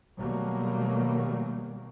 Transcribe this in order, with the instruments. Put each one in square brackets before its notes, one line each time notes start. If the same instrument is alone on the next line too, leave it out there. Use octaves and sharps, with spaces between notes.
[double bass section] B2 D#3 F#3 G3 A3 A#3